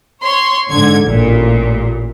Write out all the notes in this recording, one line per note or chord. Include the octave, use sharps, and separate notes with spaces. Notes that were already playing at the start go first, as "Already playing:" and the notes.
C#5 C6
G#2 D3 G#6
A1 A#2